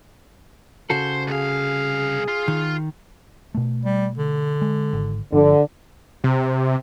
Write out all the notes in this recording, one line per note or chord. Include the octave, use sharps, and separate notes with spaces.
C#3 F#4 A4 C5
C2 G#4 F5
F4
D#3
B2 A3
G3
D3
G#3
G#1
G1 D3 F3
C3